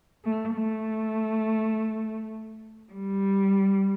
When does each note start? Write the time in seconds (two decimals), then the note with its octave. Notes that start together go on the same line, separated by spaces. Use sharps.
0.24 A3
0.54 A3
2.91 G3